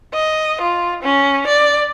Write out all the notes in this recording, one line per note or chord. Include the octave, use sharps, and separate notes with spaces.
D#5
F4
C#4
D5